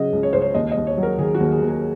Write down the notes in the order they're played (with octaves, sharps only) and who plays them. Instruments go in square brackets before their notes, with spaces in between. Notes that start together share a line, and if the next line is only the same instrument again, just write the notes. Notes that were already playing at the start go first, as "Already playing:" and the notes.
Already playing: [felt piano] C#3 F#3 D#5
C#2
C#5
C#2 C5
C#5
D#2 D#5
D#5
D#2
C#5
F#3
A#4
D#3 G#4
F#4
D#2
G#4
D#2
G#4